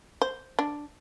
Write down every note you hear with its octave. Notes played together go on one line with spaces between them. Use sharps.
C5
D4